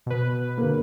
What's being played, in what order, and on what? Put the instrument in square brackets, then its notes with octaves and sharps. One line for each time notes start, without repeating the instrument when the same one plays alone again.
[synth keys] B2 B4
[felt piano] G1 A#3